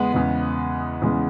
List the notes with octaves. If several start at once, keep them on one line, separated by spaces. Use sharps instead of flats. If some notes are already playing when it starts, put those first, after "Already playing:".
Already playing: E2 C#3 G#3 B3
E2 C#3 G#3
E2 C#3 G#3